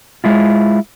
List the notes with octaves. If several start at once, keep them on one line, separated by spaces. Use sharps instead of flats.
G#3 E4 F4